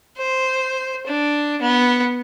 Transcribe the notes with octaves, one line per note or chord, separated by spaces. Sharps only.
C5
D4
B3